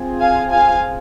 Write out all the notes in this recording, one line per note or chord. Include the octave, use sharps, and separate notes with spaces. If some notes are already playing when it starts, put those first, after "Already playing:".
Already playing: C4 F4 G#4
F5 G#5
F5 G#5